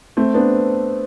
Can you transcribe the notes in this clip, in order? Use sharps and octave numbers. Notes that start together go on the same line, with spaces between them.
A3 C4
B3 D4